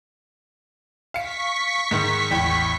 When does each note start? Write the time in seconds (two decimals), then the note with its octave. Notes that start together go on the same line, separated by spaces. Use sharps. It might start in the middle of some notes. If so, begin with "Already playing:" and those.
1.14 F5 C#6 B6 C#7
1.91 G#2 D#3
2.31 A1 E2 G5